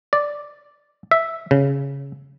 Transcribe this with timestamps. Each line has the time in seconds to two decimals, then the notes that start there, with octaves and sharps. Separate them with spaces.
0.13 D5
1.11 E5
1.51 C#3